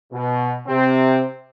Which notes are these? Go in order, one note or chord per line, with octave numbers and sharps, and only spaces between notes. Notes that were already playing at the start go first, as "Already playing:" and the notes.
B2
C3 C4